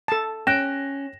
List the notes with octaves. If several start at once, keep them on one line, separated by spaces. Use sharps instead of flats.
A4 A5
C#4 G5 F#6 A#6 E7